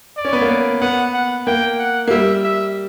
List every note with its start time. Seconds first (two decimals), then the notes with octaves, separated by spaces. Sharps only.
0.17 D5
0.25 C#4
0.33 B3
0.41 A#3
0.81 B3 F#5
1.14 F#5
1.47 A#3 G5
1.79 F#5
2.08 A#3
2.11 G3 E5
2.44 E5